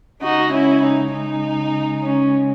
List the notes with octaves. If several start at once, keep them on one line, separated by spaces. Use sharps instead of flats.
C#3 G#3 D#4 F#4
C#4 E4
D#4
D#4
C#4